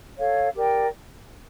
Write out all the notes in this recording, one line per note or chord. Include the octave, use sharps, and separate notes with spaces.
A4 C#5 F5
G4 A#4 D5 G5